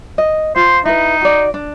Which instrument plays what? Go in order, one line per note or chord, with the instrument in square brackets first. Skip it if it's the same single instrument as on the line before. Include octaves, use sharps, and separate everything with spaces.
[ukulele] D#5
[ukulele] F4 [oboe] C5
[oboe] D#4 [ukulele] E4 B4
[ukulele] F#4 D5
D4